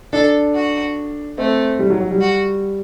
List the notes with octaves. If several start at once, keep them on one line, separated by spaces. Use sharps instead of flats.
D4 A4
F#4
A3 C4
G3
F#3
F#3
G3
F#4